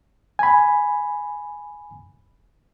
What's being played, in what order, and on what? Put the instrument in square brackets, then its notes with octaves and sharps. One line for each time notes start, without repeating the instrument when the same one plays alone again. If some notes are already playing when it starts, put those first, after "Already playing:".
[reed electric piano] G#5 B5